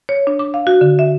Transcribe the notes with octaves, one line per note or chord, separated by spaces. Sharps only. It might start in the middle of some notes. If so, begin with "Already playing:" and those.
C#5
D4
D6
F5
F#4
D3
E5